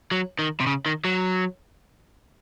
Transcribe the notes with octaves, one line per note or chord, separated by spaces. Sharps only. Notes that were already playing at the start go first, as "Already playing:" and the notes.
F#3
D#3
C3
C#3
D#3
F#3